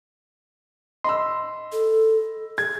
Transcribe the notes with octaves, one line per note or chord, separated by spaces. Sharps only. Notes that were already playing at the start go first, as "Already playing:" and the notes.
D#5 B5 C6 E6
A4
G#4 G#6